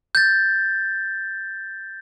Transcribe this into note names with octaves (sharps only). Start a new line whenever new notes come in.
G6 A6